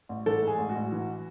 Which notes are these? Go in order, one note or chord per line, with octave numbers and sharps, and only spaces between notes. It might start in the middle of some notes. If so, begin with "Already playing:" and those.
A1
E3 A4
G#2 G#4
A1
F#4
A1
E3